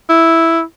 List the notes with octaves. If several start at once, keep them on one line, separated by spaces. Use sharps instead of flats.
E4